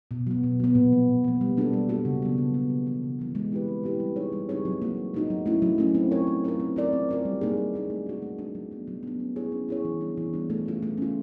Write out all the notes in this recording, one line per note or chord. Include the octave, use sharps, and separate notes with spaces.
B2
F#3 B3
B2
F#3 B3
A#2
F3 A#3
A#2
F3 A#3
G3
A#3 D4 F#4 A4
G3
A#3 D4 F#4 A4
C#3
F#3 B3
C#3
F#3 B3
C#3
E3 G3 B3
C#3
E3 G3 B3
G#3
C4 E4 G4 B4
G#3
C4 E4 G4 B4
G3
C4 D#4 G#4 C#5
G3
C4 D#4 G#4 C#5
F#3
A#3 D#4 F#4
F#3
A#3 D#4 F#4
F#3
A3 C#4 E4
F#3
A3 C#4 E4
C4
F4 A#4 C#5
C4
F4 A#4 C#5
C4
F4 A#4 D5
C4
F4 A#4 D5
G3
A#3 D#4 G#4
G3
A#3 D#4 G#4
A3
D4 F#4
A3
D4 F#4
F#3
B3 D4
F#3
B3 D4
C#4
E4 G#4 C#5
C#4
E4 G#4 C#5
E3
G3 B3 D4
E3
G3 B3 D4
A3
C#4 F4
A3
C#4 F4